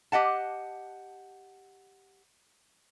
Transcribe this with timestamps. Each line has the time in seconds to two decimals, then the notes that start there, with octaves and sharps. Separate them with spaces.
0.12 G4 D#5 F#5 A5